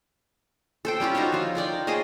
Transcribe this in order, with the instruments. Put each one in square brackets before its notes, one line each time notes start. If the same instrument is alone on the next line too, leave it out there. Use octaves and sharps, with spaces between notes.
[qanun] A4 C5 G5
G3 C#4 F4 G4
D#4 F#4 C5 C#5
F3 F4
D#4 A#4 D5 G5
G#4 C5 C#5 D#5